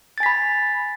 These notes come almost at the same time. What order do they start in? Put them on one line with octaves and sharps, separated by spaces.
A6 G#5 B6 B5